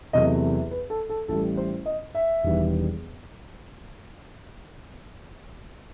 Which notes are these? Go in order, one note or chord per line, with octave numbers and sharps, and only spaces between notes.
E2 C3 F#3 A3 D#5
B4
A4
A4
A1 A2 G3 A4
C5
D#5
E5
E1 E2 D#3 G3 B3